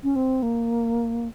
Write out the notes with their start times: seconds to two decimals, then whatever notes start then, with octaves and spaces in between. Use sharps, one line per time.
0.03 C#4
0.16 C4
0.42 A#3